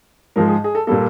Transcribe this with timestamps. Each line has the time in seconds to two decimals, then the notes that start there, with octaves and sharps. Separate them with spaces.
0.36 G#2 F3 G#3 A#4
0.48 G#4
0.64 G#4
0.75 A4
0.87 A#2 G3 A#3 A4